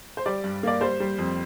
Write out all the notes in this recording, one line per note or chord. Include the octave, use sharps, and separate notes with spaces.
C5
G3 D5
G2
A#3 D5
G3 C5
G3
F2